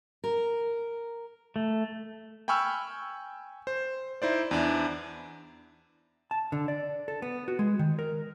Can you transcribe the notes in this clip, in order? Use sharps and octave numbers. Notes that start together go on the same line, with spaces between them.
A#4
A3
G5 G#5 B5 C#6 E6 F6
C5
D#4 E4 C5 D5
E2 D4 E4
A5
D3
D5
A4
B3
F#4
G#3
D#3
A#4